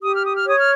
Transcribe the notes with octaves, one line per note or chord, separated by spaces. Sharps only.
G4 D#6
F6
D#6
F6
C#5 D#6
F6